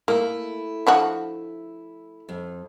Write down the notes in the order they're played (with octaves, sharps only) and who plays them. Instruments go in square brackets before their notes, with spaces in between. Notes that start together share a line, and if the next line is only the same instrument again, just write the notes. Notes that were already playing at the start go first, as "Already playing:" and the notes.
[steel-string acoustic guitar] A3 E4 [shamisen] A#3
[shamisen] D3 F3 F#4
[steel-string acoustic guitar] F2